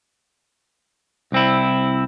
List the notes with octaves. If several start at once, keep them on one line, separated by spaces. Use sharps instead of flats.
C2 C4 E4